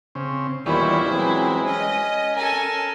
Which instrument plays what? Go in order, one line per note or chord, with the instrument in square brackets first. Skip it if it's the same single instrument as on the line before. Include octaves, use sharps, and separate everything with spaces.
[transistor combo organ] C#3 C4
[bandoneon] E2 A#2 D#3 [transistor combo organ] E3 G3 C#4 [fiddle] E4 C5
[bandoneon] E3 F#3 C4 [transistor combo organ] G#3
[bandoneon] C#4 [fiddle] D#5
[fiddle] A4 G#5 [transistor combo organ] A#4